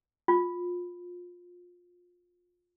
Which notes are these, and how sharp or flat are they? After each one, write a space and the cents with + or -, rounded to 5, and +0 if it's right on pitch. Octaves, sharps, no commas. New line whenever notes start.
F4 +20